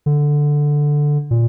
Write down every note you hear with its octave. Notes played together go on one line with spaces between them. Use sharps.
D3
A#2